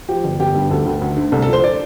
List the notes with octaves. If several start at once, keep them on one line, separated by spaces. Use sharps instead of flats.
F3 G4
G1
G1 G4
G2
D2 A4
D2
D2
D3
C2 A4
A4
F3
C5
D5